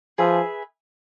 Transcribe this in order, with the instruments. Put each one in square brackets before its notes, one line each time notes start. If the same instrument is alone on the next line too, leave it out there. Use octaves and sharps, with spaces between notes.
[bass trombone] F3 [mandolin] G#4 B4 E5